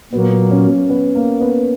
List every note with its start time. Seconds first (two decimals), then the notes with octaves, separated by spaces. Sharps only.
0.13 A#2 F#3 A#3 B3
0.51 C#4
0.90 B3
1.15 A#3
1.40 B3